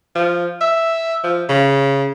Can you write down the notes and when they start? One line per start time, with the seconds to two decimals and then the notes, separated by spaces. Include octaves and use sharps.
0.15 F3
0.61 E5
1.23 F3
1.49 C#3